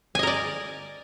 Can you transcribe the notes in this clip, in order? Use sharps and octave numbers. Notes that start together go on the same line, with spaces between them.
A#4 D5 D#5 G#5